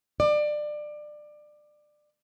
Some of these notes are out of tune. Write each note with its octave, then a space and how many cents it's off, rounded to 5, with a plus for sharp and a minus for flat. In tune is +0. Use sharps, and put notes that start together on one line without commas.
D5 +25